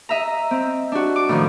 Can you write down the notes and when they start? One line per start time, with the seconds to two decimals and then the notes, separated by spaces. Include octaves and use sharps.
0.09 D#5 E5 A#5
0.51 C4
0.92 D4 F#4
1.16 D6
1.29 A2 D#3 F3